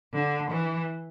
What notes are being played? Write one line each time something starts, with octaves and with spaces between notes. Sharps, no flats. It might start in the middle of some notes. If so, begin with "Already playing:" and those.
D3
E3